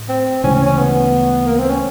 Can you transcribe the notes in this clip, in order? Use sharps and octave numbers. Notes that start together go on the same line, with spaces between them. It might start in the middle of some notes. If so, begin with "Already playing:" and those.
Already playing: A2
C4
D2 C#3 E3 G#3 C#4
C#4
C#4
B3
A#3
C4
C#4